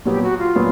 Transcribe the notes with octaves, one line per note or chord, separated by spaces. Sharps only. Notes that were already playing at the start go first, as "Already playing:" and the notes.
A#2 F#3 B3 G4
F#4
F4
A#2 F#3 B3